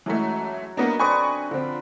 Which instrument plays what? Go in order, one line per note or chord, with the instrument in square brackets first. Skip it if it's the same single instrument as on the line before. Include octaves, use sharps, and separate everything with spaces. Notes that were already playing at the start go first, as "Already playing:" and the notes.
[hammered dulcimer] F#2 F#3 C#5 [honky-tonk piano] E3 G#3 A3
[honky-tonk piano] A#3 B3 D4 [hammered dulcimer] D#4 A#5
[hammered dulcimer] D3 C4 D5 [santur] B4 [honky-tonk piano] G#5 C#6 D#6
[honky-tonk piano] D3 C4 [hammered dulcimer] F3